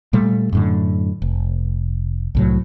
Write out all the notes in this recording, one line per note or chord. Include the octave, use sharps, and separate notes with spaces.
A#2 G3 A3
F#2 A2 D3
F1
C2 A2 F#3